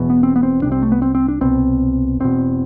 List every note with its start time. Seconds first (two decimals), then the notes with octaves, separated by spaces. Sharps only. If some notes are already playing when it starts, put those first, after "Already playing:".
Already playing: E1 E2 B2
0.10 B3
0.23 C4
0.36 B3
0.43 C4
0.62 C2 C3 D4
0.72 C4
0.83 A3
0.92 B3
1.02 C4
1.15 C4
1.28 D4
1.41 C2 B2 C4
2.20 E1 E2 B2 C4